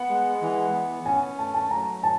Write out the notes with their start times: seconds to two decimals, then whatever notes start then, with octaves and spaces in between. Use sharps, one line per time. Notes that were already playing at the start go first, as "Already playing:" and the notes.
Already playing: B3 F#5
0.09 G#3
0.42 E3
0.73 B3
1.06 C#4 G#5
1.38 A3 A5
1.54 A5
1.71 F#3 A#5
2.03 F#3 A5